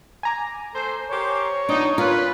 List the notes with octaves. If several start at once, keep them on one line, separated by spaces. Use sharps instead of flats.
G#5 A#5 D6
A3 A4 C5
G4 A#4 C5 C#5
F3 B3 D4 D#4
C#4 F4 A#4 B4